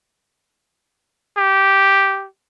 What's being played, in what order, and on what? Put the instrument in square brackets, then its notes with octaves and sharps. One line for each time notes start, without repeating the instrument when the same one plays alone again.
[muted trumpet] G4